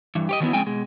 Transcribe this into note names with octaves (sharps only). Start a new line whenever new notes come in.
G2 E3
G4 C#5 D#5
D#3 E3 F#3 A#3 B3 E4
F2 C#3 G#3 C4 G5 G#5
B2 G#3